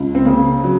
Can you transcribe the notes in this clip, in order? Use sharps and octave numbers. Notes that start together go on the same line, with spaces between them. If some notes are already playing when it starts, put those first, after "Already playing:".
Already playing: C#2
C4
C#3 A#3
F#3